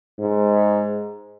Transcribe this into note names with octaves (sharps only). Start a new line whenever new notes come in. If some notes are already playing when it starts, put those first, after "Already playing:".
G#2